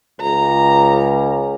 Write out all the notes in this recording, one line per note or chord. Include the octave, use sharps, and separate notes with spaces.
C#2 A#5